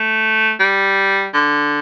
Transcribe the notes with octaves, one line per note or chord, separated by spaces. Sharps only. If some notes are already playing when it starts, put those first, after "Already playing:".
Already playing: A3
G3
D3